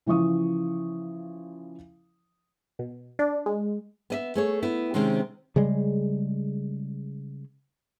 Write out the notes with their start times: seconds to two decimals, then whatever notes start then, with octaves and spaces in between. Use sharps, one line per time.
0.06 C#3 E3 F3 C#6 D#6
2.79 B2
3.19 D4
3.46 G#3
4.10 B3 D#5 E5
4.35 A3 G#4 C#5
4.63 B3 E4
4.94 C3 D#3 G#3 C4 C#4
5.56 C#3 G3 G#3